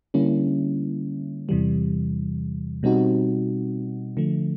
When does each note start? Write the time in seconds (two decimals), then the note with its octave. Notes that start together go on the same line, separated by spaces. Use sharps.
0.14 D3 G3 A#3 C#4 E4
1.49 E2 C3 E3 G3
2.83 B2 G3 C4 D#4 F#4
4.17 D3 F3 A3